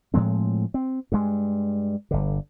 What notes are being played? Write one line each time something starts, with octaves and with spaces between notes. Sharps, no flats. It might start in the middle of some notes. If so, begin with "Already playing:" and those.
A2 F3 G#3 C4
C4
G2 G#3
G1 D3